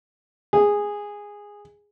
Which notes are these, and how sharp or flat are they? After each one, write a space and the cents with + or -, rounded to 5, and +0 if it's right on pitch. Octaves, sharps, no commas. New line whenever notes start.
G#4 -10